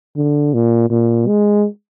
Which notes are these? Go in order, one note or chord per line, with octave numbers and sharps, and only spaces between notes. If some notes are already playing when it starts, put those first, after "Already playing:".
D3
A#2
A#2
G#3